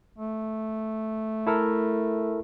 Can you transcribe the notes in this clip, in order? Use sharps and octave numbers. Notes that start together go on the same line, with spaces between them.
A3
E4 A4 A#4